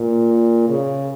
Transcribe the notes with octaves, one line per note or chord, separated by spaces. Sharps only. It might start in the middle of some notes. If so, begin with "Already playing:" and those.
Already playing: A#2
C#3